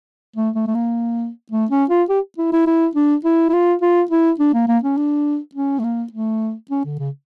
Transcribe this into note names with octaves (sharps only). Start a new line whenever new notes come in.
A3
A3
A3
A#3
A3
C#4
F4
G4
E4
E4
E4
D4
E4
E4
F4
F4
E4
D4
A#3
A#3
C#4
D4
C#4
A3
A#3
A3
C#4
D3
C#3